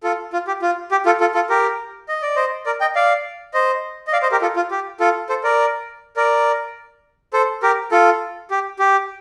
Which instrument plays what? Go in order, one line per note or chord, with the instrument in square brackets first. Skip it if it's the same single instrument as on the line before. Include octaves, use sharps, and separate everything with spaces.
[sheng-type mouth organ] F4 A4
F4
G4
F4
G4
F4 A4
F4 A4
F4 A4
G4 A#4
D#5
D5
C5 D#5
A#4 D5
D#5 G5
D5 F5
C5 D#5
D#5
D5 F5
C5 D#5
G4 A#4
F4 A4
F4
G4
F4 A4
A4 C5
A#4 D5
A#4 D5
A4 C5
G4 A#4
F4 A4
G4
G4